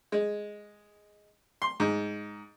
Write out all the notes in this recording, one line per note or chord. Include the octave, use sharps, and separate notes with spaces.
G#3
C6
G#2